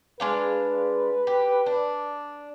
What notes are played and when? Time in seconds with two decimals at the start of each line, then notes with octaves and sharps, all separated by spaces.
0.20 G#3 D4 B4 F5
1.27 G4
1.66 D4